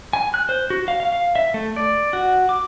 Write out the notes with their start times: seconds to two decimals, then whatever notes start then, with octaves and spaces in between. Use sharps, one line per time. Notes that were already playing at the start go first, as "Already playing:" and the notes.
0.13 G#5
0.34 F#6
0.49 C5
0.70 F#4
0.88 F5
1.00 F5
1.13 F5
1.35 E5
1.54 A3
1.76 D5
2.13 F#4
2.49 D6